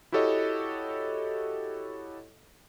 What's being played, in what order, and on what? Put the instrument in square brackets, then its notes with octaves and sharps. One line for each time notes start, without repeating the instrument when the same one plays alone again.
[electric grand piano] E4 F#4 G4 A4 C#5 D#5